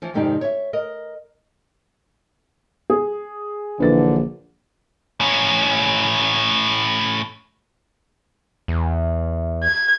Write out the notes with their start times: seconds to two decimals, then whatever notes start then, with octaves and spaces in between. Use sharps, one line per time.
0.02 E3 F3
0.14 F2 G#2 C3 D#3 D#4 D5
0.41 C#5 E5
0.73 A#4 D#5
2.90 G#4
3.80 A#1 D3 E3 B4 A6
5.21 A2 C#4
8.68 E2
9.63 G#6